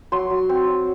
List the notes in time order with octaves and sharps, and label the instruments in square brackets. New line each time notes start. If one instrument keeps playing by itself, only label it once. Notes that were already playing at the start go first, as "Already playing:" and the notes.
[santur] F#3 C6
F#3
C4
F#3